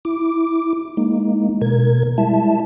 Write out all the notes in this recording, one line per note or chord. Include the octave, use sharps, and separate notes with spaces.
E4 D6
G#3 A#3 D#4
B2 A#4 G#6
G3 G#3 E4 E5 A5